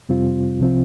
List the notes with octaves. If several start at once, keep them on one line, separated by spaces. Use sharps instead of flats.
F2 C3 G3 C4 F4
C2 C3 F3 C4 F4